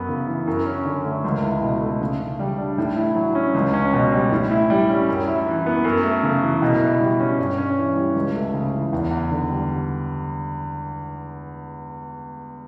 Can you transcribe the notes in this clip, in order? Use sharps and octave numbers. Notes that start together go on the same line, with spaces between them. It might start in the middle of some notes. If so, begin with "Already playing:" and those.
Already playing: F#2 B3
C#3
E3
F#2
C#4
D3
A3
C#2
E4
B2
A3
C#3
C#3
G3
D4
A2
E4
F#3
C#4
C#2
C#4
B2
G3
A2
E4
G3
C#4
F#2
E4
E3
B3
F#2
A3
C#3
E3
B2
E4
G3
C#4
G2
C#4
E3
G3
C#2
A3
C#3
E3
E2
E2
D3
G3